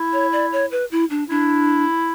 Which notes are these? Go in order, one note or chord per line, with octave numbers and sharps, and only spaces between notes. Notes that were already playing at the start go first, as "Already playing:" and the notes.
Already playing: E4
C#5
D5
C#5
B4
E4
D4
D4 E4